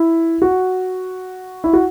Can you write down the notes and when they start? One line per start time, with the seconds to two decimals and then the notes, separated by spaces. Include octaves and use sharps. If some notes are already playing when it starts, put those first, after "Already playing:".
Already playing: E4
0.42 F#4
1.64 E4
1.73 F#4